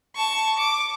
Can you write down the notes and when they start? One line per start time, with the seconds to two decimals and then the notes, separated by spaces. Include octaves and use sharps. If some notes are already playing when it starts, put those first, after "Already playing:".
0.16 A5 C#6
0.58 D6